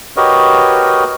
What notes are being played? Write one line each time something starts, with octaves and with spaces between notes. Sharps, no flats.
F#4 G4 A#4 B4 C#5 D#5